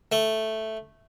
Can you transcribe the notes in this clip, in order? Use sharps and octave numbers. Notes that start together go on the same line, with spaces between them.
A3